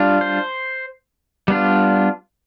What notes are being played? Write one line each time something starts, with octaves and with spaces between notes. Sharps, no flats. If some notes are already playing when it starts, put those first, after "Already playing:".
Already playing: G3 D4 F4
C5
G3 B3 D4 F4